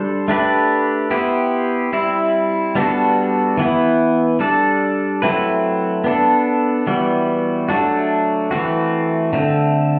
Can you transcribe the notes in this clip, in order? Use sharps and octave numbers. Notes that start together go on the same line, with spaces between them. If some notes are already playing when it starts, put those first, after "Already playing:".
Already playing: G3 D4 A4 C5
A3 D4 G4 B4 D5
B3 E4 G4 C5
G3 C4 E4
G3 B3 D4 F#4 A4
E3 B3 E4
G3 D4 A4 D5
F#3 A3 C4 E4 B4
B3 D4 A4
E3 G3 B3 F#4
F#3 A3 D4 F#4
E3 A3 C4 F#4
D3 A3 C4